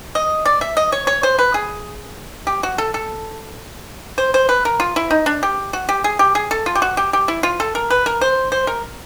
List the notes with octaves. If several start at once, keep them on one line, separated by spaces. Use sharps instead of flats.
D#5
D5
E5
D#5
C#5
C#5
C5
B4
G#4
G4
F#4
A4
A4
C5
C5
B4
A#4
F4
E4
D#4
D4
G4
F#4
G4
G#4
G4
G#4
A4
F4
G4
F#4
G4
G4
E4
F4
A4
A#4
B4
A#4
C5
C5
A#4